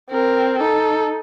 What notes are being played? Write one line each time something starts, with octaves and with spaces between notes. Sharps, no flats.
C4 A#4
D#4 A4